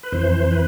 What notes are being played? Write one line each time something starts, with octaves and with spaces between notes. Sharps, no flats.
B4
F2 E3 C5
B4